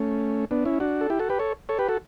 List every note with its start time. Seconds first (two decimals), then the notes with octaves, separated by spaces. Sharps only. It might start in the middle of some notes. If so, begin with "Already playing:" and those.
Already playing: A3 C#4
0.51 B3 D4
0.65 C#4 E4
0.80 D4 F#4
1.01 A4
1.10 E4 G4
1.19 F#4 A4
1.29 G4 B4
1.39 A4 C#5
1.69 A4 C#5
1.79 G4 B4
1.88 F#4 A4